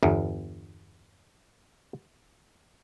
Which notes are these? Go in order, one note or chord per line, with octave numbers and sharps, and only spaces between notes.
G1 E2